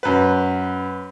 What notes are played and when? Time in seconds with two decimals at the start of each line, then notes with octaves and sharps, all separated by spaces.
0.03 F#2 B4